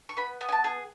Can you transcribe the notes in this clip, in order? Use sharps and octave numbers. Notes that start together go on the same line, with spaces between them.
C#6
B3 B5
B3
G#5
A5
G#4